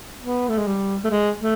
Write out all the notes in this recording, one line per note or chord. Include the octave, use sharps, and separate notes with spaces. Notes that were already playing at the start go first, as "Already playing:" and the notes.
B3
A3
G#3
G3
A3
G#3
A3